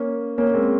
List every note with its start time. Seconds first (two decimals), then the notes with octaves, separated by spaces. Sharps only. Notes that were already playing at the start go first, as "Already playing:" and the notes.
Already playing: A#3 C#4
0.38 A#3 C#4
0.54 G#3 C4